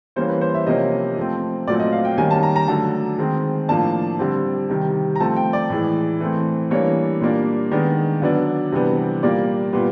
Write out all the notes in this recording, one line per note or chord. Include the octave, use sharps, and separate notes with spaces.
E3 G3 A#3 C#4 C5
B4
C5
E5
C3 F3 A#3 C#4 D#5
F3 A3 C4
A#2 F#3 A3 C4 D5
D#5
F5
G5
D#3 G3 A#3 C#4 G#5
A5
A#5
A#5
D3 F#3 A3 A5
D#3 G#3 C4
A2 F3 A#3 D4 A5
D3 G3 C4
C3 D#3 G3
A#5
F3 A3 C4 A5
G5
D5
A2 E3 G#3
E3 A3 C4
E3 G3 A#3 D4 C#5
A#2 G3 A#3 D4
D#3 G#3 B3 D4 D5
D3 F#3 B3 D4
C3 E3 G3 B3 D4
A#2 G3 A#3 D5
A#2 G3 B3